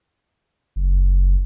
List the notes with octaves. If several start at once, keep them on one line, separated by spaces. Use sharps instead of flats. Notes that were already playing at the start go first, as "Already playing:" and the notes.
F#1